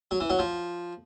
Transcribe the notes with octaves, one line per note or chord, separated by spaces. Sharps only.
F#3
E3
F#3
F3